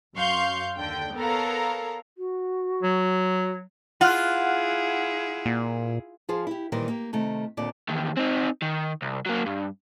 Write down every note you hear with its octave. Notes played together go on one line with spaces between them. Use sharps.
F#2 F5 C6 C#6 G6
D#2 D3 G5
B3 A4 A#4 C#5 F5 A#5
F#4
F#3
E4 F4 G#4 F#5 F6 F#6
A#2
F3 F4 G#4 C5
E4 G4
A#2 D#3 E3 G3 A#4 C5
A#3 G4
C3 D#3 A3
D#2 A#2 D3 C4 D5
E2 D#3
C4 D#4
D#3
C2
F#3 A#3
G2